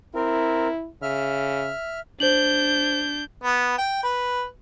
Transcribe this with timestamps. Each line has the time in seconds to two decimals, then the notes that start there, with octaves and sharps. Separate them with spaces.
0.15 C4 E4 A#4
1.02 C#3 E5 F6
2.20 D4 C5 G6 F#7
3.43 B3
3.78 G5
4.03 B4